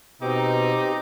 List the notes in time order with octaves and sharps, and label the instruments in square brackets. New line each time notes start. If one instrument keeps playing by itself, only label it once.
[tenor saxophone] B2 [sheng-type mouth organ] C4 D6 [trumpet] D#4 [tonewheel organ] G4